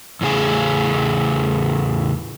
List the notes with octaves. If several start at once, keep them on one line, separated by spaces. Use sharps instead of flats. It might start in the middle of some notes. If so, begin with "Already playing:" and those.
E2 A2 C#3 G#4